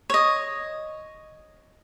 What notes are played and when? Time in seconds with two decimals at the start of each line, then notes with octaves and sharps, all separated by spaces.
0.10 C#5 D#5